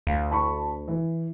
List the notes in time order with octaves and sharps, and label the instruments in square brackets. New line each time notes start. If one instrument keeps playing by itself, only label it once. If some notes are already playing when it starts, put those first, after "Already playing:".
[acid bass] D2 [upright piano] F5
[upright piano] A5 B5 C#6
E3